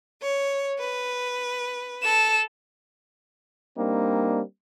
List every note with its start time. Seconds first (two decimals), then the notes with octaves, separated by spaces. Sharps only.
0.21 C#5
0.78 B4
2.02 A4 E7
3.77 G3 A#3 C4 D4 D#4